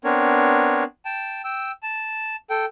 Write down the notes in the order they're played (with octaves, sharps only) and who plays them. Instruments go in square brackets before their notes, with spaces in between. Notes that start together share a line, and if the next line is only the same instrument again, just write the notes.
[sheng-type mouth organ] B3 C4 D4 A#4 C#5
G5 A5
G5 E6
A5
A4 G5